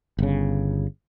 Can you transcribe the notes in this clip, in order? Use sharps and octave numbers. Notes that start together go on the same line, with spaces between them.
G1 C#3